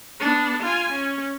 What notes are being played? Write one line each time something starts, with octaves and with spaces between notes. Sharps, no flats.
B3 D4
F4 G#5
C#4